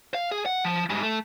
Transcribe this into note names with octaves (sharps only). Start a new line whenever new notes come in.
F5
G#4
F#5
F3
G#2 G3
A3